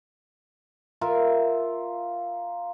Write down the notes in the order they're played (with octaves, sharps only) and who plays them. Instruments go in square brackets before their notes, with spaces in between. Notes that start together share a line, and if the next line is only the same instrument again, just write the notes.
[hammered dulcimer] F4 A#4 E5